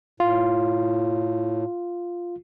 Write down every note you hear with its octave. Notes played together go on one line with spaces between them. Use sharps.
A2 F4